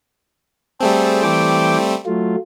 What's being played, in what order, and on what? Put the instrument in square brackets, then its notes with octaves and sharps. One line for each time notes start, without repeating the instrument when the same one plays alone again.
[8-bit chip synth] G3 A3 C4 [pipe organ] G#4 A4 C5
[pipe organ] E3 G5 D6
F#3 A3 F4